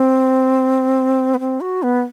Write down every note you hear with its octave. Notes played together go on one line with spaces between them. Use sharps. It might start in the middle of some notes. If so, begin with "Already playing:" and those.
Already playing: C4
B3
C4
F#4
B3